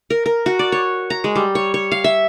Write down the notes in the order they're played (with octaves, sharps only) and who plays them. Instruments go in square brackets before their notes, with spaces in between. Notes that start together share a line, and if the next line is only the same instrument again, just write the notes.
[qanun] A#4
A#4
F#4
D5
C#5
A#5
G#3
G3
C#5
C#5
F5
E5